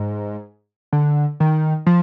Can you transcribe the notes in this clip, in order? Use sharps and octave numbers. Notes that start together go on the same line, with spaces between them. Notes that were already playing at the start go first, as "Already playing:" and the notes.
Already playing: G#2
D3
D#3
F3